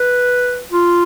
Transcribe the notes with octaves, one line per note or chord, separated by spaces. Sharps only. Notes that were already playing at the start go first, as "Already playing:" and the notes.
Already playing: B4
F4